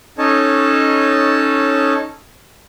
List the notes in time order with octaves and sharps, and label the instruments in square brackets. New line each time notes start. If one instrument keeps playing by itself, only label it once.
[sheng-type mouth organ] C#4 D#4 A4 C#5 D#5 A5